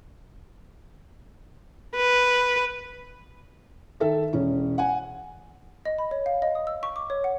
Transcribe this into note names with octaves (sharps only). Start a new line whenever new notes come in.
B4
D#3 A4 E5
E1 C#4
F#5 G#5
D#5
B5
C#5
F5
D#5
D#6
E6
C#6
D6
C#5
F#5